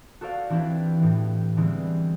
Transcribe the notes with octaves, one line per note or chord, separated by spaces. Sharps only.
F#4 A4 C5 D5 F5
E3 C4 D4 E4 G4
A2 E3
D3 E3 G3 G#3 B3 C4